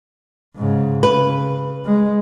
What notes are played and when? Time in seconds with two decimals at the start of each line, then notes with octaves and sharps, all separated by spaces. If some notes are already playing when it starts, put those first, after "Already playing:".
0.56 G#2 C#3
1.03 C#3 B4
1.86 G#3